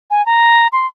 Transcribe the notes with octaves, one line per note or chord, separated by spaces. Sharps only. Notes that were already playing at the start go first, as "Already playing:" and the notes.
G#5
A#5
C6